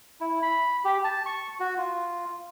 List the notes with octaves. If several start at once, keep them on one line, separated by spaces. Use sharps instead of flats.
E4
B5
G4
A5
C#6
F#4
F4